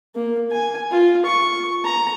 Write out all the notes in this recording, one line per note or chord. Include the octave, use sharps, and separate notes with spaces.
A#3
G#5
F4
C#6
A#5